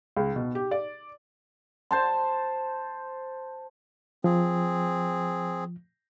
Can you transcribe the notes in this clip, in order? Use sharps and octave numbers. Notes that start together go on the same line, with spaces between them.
C#2
B2
G4
D5
C5 A5 C6
F3 C4 G#4